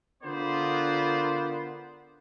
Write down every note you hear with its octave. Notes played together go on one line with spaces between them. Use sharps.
D3 B3 F4 A#4 C5 D5